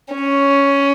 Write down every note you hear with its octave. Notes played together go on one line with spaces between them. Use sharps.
C#4